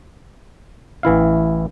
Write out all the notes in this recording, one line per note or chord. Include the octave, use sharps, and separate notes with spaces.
A1 E3 E4 F5